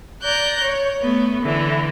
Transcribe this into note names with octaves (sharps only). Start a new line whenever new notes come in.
D5 A#5 F#6 G6
C#5
A3 B3
D3 E3